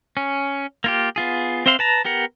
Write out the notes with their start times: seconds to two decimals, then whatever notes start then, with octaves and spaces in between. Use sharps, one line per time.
0.17 C#4
0.84 A#3 F4 G4
1.16 B3 F4 G#4
1.66 C4 C5 E5 F5 C6
1.79 B4 A5 A#5
2.05 B3 G4 A#4 F#5